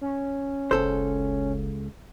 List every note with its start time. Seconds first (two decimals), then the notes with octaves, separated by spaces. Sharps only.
0.01 C#4
0.71 F#1 C#2 A4 C5